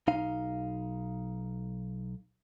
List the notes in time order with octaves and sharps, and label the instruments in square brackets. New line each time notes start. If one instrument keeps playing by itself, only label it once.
[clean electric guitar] B1 D#4 F5